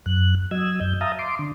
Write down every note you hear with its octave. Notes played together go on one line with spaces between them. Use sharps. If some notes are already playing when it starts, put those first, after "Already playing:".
F#2 F#6
F#3 D#5 E6 G#6
F#2 G6
E5 F5 A5 A#5 D#6
C6 D6
D3